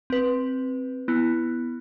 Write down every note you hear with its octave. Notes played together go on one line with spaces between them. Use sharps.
C4 B4
B3 E4